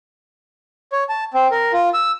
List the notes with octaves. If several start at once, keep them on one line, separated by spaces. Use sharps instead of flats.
C#5
A5
C4
A#4
F4
E6